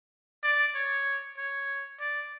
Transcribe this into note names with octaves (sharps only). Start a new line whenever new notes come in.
D5
C#5
C#5
D5